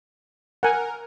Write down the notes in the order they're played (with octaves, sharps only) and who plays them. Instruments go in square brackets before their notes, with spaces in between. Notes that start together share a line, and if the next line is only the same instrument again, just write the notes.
[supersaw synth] A#4 [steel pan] F#5 G#5